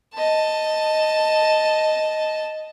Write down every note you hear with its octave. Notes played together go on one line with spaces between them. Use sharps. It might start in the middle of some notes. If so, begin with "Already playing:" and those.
D#5 A5